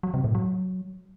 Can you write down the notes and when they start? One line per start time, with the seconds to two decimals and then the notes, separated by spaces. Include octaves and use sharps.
0.03 F#3
0.14 C3
0.24 A2
0.35 F#3